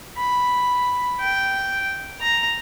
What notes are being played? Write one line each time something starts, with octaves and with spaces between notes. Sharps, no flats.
B5
G5
A#5